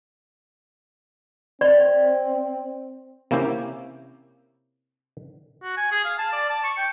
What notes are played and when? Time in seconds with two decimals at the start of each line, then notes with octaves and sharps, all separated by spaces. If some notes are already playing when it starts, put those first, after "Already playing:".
1.61 C4 D5
3.31 C3 A#3 C#4 E4 G4
5.63 F#4
5.77 G#5
5.92 G#4
6.04 F5
6.18 A5
6.32 D5
6.50 A5
6.64 C#6
6.77 G5